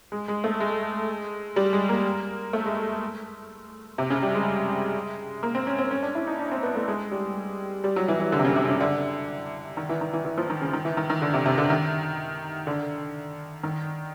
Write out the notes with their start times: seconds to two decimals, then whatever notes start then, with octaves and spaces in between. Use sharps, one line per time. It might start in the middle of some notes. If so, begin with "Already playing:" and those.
0.12 G#3
0.28 G#3
0.44 A3
0.60 G#3
1.56 G3
1.73 G#3
1.89 A#3
2.53 A3
2.66 G#3
3.98 C3
4.10 C#3
4.22 G3
4.34 G#3
5.43 A#3
5.55 C4
5.67 C#4
5.78 C4
5.91 C#4
6.03 D4
6.15 E4
6.27 D#4
6.39 D4
6.52 C4
6.63 B3
6.76 A3
6.88 G#3
7.12 G3
7.84 G3
7.96 F#3
8.08 E3
8.20 E3
8.32 D3
8.39 C3
8.44 C#3
8.56 C3
8.68 C#3
8.81 D3
9.77 D#3
9.89 E3
10.01 D#3
10.13 E3
10.25 E3
10.38 F3
10.50 D#3
10.61 C#3
10.73 D#3
10.85 E3
10.97 D#3
11.10 D#3
11.22 D3
11.34 C3
11.46 C3
11.58 D3
11.70 D#3
12.67 D3
13.63 D#3